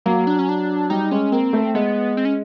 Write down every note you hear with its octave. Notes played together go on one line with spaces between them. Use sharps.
F#3 A#3
D4
C#4
D4
G3 D#4
G#3 C#4
A#3 C4
A3
G#3 B3
C4
C#4